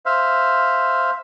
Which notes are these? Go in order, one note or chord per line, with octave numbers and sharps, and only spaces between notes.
C5 E5 F5